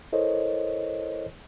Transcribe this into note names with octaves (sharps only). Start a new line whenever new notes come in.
E4 A4 A#4 C5 C#5 D#5